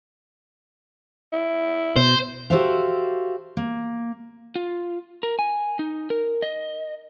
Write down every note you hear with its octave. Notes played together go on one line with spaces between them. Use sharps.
E4
B2 C5
F#4 G4 A4 C5 E5 F5
A#3
F4
A#4
G#5
D#4
A#4
D#5